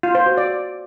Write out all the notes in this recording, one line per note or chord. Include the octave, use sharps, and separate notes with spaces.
F4
C5
F#4
D5